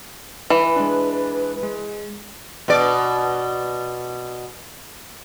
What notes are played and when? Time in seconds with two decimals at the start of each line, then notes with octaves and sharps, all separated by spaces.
0.50 E3 B4
0.76 G#3 D4
1.63 G#3
2.68 B2 D5